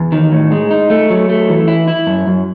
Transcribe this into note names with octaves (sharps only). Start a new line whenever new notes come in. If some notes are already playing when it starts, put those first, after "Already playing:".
Already playing: E2
D#3
A2
G#3
D#4
A3
F#3
A3
E3
E4
E4
F#2
F#2